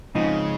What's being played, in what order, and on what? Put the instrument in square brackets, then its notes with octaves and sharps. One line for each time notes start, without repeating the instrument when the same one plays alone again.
[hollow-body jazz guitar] G#2 F3 C4 D#4 [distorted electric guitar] C#3